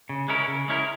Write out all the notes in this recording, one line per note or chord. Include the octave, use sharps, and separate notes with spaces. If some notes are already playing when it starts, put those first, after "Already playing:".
C#3
G#3 C#4 E4 A#4
C#3
G#3 C#4 E4 A#4